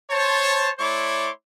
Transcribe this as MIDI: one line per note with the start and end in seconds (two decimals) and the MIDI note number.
0.11 0.70 72
0.11 0.70 73
0.11 0.70 81
0.79 1.31 57
0.79 1.31 64
0.79 1.31 73
0.79 1.31 74
0.79 1.31 84
0.79 1.31 86